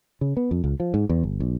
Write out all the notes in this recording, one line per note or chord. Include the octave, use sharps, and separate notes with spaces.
C#3
B3
F2
C#2
F3
G#2
E2
G1
B1